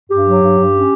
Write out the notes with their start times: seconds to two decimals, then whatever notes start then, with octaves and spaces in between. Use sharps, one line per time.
0.09 G2 G4
0.25 F#3
0.41 G2
0.56 G2
0.73 C#4